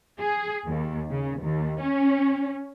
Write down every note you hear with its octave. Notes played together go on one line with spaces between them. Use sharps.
G#4
D#2
C#3
D#2
C#4